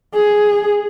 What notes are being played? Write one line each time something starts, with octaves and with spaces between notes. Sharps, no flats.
G#4